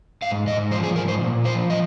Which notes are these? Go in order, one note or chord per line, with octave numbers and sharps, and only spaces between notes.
G#2 F5
G#2 D#5
F3 C5
G#4
G#2 A#4
C5
A#2
F3 C5
D#5